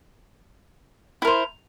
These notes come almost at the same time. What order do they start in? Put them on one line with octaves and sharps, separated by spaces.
E4 A#4 C5